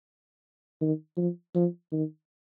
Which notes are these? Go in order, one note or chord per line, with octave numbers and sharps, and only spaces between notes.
D#3
F3
F3
D#3